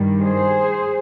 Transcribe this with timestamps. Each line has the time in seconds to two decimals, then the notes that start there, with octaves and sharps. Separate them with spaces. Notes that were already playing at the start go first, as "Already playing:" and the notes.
Already playing: G2 D#3 G3
0.21 G#4 C5